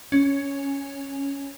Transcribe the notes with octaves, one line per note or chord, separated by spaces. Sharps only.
C#4